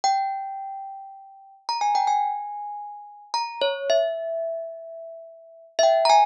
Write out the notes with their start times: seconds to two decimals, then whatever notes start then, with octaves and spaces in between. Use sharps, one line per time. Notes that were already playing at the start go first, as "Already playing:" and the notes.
0.04 G5
1.69 A#5
1.81 G#5
1.95 G5
2.07 G#5
3.34 A#5
3.62 C#5
3.90 E5
5.79 E5
5.83 G5
6.05 A#5
6.10 G#5